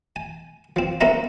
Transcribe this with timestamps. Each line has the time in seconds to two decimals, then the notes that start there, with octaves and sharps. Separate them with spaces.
0.16 G#5
0.76 F3 C4
1.01 G2 A#3 C4 C#4 E5 A#5